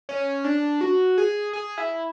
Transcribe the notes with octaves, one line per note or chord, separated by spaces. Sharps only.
C#4
D4
F#4
G#4
G#4
E4